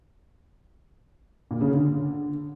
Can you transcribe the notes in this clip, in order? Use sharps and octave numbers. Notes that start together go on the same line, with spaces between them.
A#2
C#3
D3